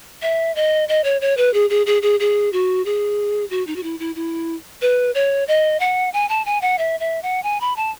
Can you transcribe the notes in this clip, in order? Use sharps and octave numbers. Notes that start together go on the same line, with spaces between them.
E5
D#5
D#5
C#5
C#5
B4
G#4
G#4
G#4
G#4
G#4
F#4
G#4
F#4
D#4
F#4
E4
E4
E4
B4
C#5
D#5
F#5
G#5
A5
G#5
F#5
E5
E5
F#5
G#5
B5
A5